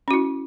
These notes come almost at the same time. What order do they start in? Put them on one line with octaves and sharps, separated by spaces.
C#4 F#4 E4